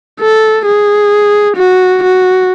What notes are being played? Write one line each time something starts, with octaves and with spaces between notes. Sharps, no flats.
A4
G#4
F#4
F#4